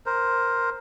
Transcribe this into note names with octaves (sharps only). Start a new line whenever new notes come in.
A#4 C5